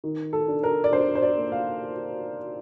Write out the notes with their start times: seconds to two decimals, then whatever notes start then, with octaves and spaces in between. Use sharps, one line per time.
0.04 D#3
0.33 A4
0.48 D4
0.63 A#4
0.84 D5
0.93 D4 C5
1.15 C5
1.23 D5
1.38 A#3
1.52 F5